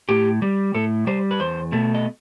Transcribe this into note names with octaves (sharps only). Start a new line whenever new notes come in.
A2 G4
G3
A2 A4
G3 C5
B4
E2 C5
B2 A3
D#5